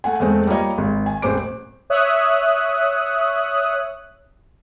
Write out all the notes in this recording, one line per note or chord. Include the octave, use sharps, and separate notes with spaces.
A3 F#5 G#5
E2 G#3 A3 C4
G3 A#3 F4 C#5 D#5
G#1
G#5
E1 A1 C4 C5 D6 D7
C#5 E5 D#6 F#6